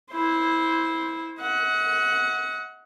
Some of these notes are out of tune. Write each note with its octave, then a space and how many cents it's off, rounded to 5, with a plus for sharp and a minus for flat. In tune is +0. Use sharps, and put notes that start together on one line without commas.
E4 -15 C5 +0
D#5 +40 F#5 +0